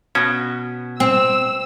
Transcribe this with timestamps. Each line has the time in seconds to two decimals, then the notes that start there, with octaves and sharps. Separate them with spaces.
0.15 B2 C#4
1.00 C4 E6